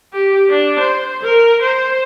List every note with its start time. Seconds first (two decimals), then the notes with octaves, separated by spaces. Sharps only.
0.14 G4
0.50 D4
0.80 C5
1.23 A#4
1.62 C5